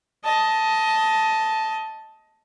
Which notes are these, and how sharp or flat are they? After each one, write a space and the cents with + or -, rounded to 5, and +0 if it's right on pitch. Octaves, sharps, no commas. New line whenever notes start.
D#5 +15 A5 +0